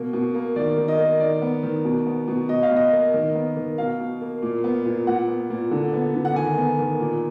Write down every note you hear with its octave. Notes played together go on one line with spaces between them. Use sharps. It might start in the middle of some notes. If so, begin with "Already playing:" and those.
Already playing: B2 A#3
B2
A#3
D#3 D5
D#3
D#5
A#3
D#3 D5
B3
D#3
B2
B3
B2
B2 D#5
F5
B2
D#5
A#3
D#3
B3
D#3
B2 F5
B2
A#3
A#2
B3
A#2
A#2 F#5
B3
A#2
D3
B3
D3
F#5
D#3 G#5
B3
D#3
A#2